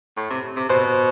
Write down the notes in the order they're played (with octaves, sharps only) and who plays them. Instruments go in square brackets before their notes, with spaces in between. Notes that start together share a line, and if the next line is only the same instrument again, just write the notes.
[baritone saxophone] A2
C3
C3
[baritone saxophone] B2 [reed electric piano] C5